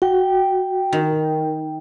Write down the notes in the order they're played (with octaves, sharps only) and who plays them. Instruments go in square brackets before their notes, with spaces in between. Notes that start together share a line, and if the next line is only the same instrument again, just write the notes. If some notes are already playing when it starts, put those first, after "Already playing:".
[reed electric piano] F#4 [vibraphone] G5
[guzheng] D#3